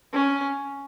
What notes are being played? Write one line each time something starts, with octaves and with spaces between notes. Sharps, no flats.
C#4